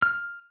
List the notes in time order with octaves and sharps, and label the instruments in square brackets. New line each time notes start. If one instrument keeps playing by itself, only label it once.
[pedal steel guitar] F6